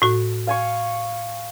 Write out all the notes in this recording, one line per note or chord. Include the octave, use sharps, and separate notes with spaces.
A2 F#4
F5 G#5 C#6